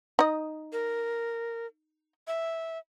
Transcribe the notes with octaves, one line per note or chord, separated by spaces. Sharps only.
D#4 D#5
A#4
E5